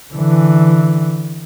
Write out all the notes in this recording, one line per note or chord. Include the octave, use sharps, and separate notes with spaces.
D3 E3